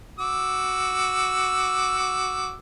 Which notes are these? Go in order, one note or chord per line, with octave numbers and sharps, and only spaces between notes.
F#4 D6 E6